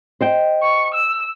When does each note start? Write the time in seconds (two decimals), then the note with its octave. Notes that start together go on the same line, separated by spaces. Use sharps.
0.21 C5 D#5 G5
0.62 C#6
0.95 E6